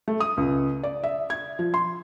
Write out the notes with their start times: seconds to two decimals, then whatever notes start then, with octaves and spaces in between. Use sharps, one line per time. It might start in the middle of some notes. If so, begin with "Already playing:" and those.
0.08 A3
0.20 D#6
0.37 C#2
0.83 D5
1.04 E5
1.30 G#6
1.59 F3
1.74 C6